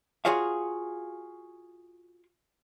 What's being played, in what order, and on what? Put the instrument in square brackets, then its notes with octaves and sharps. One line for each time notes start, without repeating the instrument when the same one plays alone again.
[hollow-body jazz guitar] F4 F#4 G#4 C#5 F5